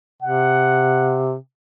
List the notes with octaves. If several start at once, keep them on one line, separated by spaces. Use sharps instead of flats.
C3 F#5